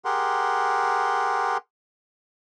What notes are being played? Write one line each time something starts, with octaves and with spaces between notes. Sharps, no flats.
G4 G#4 A#4 F#5 C6